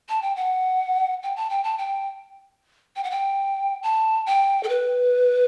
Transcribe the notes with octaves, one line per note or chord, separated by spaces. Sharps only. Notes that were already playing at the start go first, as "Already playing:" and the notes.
A5
G5
F#5
G5
A5
G5
A5
G5
G5
F#5
G5
A5
G5
A4
B4